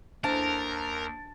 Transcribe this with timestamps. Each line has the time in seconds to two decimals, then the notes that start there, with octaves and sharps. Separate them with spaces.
0.24 D#2 D4 A#4 C5 A5